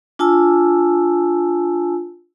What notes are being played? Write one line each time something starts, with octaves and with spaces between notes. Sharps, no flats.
D4 F4 G#5 A5 E6